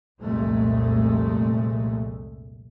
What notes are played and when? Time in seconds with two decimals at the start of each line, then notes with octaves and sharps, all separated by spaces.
0.20 C2 F2 A#2 G#3 A3